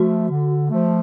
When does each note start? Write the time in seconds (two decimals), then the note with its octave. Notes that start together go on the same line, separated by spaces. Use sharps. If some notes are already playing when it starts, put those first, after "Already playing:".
Already playing: F3 A3 F#4
0.29 D3
0.70 F3 A3